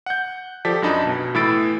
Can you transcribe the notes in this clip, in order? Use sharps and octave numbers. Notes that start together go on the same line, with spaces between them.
F#5 G6
F3 G4 A4 D5 B6
F#2 D4 D#4 D#5 A5 B5
B1 B2
A2 E3 B5 E6 A6 D7